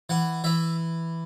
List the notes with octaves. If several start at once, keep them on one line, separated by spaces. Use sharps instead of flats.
E3 F#5
E3 E5